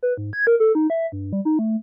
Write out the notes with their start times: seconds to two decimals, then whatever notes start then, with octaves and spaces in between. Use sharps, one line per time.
0.03 B4
0.17 G#2
0.33 G#6
0.47 A#4
0.60 A4
0.75 D#4
0.90 E5
1.12 G2
1.33 G3
1.45 D#4
1.59 A3